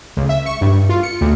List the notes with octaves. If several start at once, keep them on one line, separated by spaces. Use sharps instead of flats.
C#2
E5
C#6
G2
F4
C#7
D2